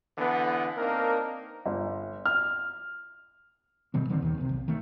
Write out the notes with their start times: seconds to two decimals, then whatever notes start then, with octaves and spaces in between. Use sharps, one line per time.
0.18 D3 E3 B3
0.78 A#3 C4 D4 D#4 A#4
1.66 G1
2.25 F6
3.94 B2 D#3 G3 C4
4.09 D1 D3 D#3 C4
4.22 D#2 D#3
4.38 B1 C3
4.49 B1
4.68 D#3 A3